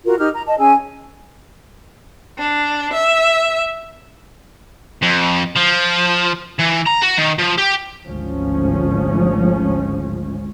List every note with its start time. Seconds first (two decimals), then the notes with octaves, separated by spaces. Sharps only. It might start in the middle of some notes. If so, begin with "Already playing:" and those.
0.05 F4 F#4 A#4
0.18 D#4 G4 F6
0.32 A#5
0.46 D#5 A5
0.58 C#4 G#4 G#5 E6
2.38 D4
2.93 E5
5.02 F2
5.56 F3
6.59 E3
6.86 A#5
7.02 F#4
7.18 D#3
7.39 F3
7.58 G4
8.06 G#1 D2 G#2 F3 C#4